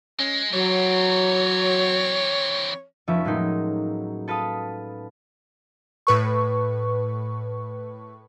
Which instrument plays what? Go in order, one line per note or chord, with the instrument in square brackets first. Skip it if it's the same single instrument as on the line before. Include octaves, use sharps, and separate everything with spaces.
[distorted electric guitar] G#3 [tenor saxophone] C#4
[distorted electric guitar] E3 C4 [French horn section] F#3 [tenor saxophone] C#5
[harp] F1 F3 C#4 B4 E5 B6
A2 F#3 G#3 A#3 D#4
A4 B4 F5 A5 D#6
[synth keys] A2 B4 C#6